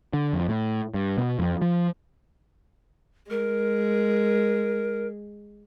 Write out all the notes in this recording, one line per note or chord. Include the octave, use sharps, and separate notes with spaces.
D3
F2
A2
G2
B2
F2
F3
G#3 A#4